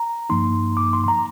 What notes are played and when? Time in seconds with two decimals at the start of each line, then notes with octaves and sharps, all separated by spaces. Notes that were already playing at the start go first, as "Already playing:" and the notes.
Already playing: A#5
0.30 G2 F3 A#3 D#4 C6
0.77 D6
0.93 C6
1.04 C6
1.08 A#5